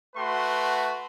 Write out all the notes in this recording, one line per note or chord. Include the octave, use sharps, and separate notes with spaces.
A3 F#4 B4 C6